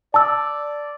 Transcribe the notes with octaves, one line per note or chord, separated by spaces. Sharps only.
D5 A5 E6